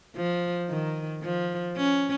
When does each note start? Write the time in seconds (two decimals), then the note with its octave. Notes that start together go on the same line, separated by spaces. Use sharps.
0.16 F3
0.69 D#3
1.23 F3
1.77 C#4